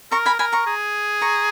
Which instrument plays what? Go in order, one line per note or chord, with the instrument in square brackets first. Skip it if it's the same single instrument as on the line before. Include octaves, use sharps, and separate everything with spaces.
[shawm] A#4 [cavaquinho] A#5 C#6
[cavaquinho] G#5 B5
[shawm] A#4 [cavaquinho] G#5 B5
[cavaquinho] A#5 C#6
[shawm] G#4
[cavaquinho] A#5 C#6